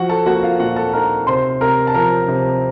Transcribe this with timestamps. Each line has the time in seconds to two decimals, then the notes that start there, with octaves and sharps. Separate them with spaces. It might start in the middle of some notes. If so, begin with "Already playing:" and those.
Already playing: F3 F#4 F#5
0.09 A4 A5
0.26 A#3 F#4 F#5
0.43 F4 F5
0.60 A#2 F#4 F#5
0.76 A4 A5
0.93 D#4 A#4 A#5
1.27 C3 C5 C6
1.61 C3 A#4 A#5
1.87 A5
1.94 F3 A#4 A#5
2.28 C3